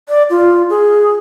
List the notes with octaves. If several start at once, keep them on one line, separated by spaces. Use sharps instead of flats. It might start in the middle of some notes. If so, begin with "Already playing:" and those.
D5
F4
G#4